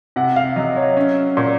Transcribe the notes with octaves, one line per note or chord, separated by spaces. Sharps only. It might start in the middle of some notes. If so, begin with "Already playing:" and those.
C3 F#5
F5
F#3 D#5
C#5
C#4
A#2